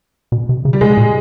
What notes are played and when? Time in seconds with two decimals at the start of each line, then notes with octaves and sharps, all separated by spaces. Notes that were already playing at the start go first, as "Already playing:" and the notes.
0.32 B2
0.49 C3
0.65 C#3
0.73 G3
0.81 C3 G#3
0.97 A#2